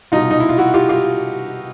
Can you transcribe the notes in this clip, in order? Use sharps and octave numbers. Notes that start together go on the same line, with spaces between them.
C2 B2 D#4 F4
D#4
E4
F4
E4 F#4
F4 G4
F4 G4